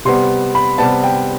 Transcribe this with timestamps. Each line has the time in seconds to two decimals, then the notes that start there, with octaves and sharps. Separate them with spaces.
0.05 C3 G3 B3 C6
0.55 B5
0.78 C3 G3 B3 A5
1.04 G5